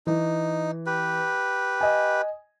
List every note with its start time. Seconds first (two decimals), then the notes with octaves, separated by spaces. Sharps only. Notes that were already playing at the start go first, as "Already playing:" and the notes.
0.07 E3 D#4
0.86 G4 B4
1.81 D#5 G#5